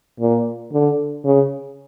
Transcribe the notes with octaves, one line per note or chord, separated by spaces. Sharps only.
A#2
D3
C#3